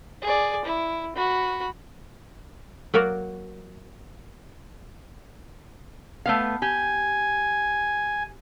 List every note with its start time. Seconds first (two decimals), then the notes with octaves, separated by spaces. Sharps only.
0.22 G#4 D5
0.65 E4
1.16 F#4 B5
2.94 F#3 A#3 F#4 A#4 D5
6.26 A3 B3 F5
6.62 G4 G#5